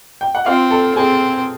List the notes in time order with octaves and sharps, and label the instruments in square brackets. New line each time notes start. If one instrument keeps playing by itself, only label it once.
[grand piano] G5
F#5
[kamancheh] C4 [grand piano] F4 F5
[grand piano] A4 A5
[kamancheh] C4 [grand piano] G#4 G#5